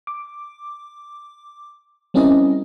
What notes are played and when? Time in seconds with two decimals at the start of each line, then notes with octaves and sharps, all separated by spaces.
0.07 D6
2.14 G3 C4 C#4 E4 A#4 D#5